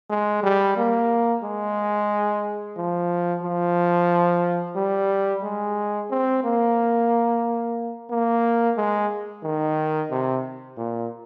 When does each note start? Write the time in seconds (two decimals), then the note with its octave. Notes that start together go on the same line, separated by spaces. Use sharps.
0.10 G#3
0.44 G3
0.77 A#3
1.44 G#3
2.77 F3
3.43 F3
4.76 G3
5.43 G#3
6.11 C4
6.44 A#3
8.10 A#3
8.77 G#3
9.43 D#3
10.11 C3
10.77 A#2